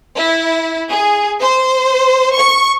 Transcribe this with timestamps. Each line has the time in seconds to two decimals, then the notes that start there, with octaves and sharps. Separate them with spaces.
0.14 E4
0.89 G#4
1.42 C5
2.36 C#6